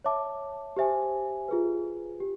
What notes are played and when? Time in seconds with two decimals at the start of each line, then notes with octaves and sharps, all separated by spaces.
0.04 C#5 E5 A5 D6
0.77 G4 C5 E5 G#5
1.49 F4 G#4 B4
2.20 G4